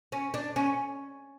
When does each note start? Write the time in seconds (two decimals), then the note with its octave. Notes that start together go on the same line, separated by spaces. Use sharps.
0.12 C#4
0.34 D4
0.56 C#4